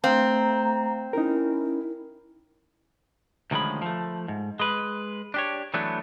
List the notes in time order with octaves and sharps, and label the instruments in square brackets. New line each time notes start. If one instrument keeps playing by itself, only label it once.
[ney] A3 [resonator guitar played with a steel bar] C4 [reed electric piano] F5 [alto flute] A#5
[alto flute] C#4 [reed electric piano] D#4 A#4 [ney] E4
[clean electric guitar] D2 D#3 F3 G#3 C#4 B5
F3 A3
G#2
G#3 B4
D4 G4 C#5
E3 F#3 A3 B3 D4